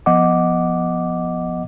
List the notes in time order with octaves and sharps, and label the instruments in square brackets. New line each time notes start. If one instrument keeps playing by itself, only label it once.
[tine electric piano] F3 B3 D#5 F#5 D6